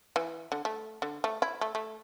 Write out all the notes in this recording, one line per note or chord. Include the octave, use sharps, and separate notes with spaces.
E3
D3
A3
D3
A3
E4
A3
A3